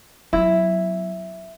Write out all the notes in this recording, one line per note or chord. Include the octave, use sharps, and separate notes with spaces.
F#3 B3 E4